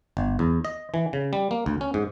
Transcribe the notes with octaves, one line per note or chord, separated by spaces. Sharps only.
G1
E2
D#5
E3
C#3
G3
A#3
D2
C#4
G#2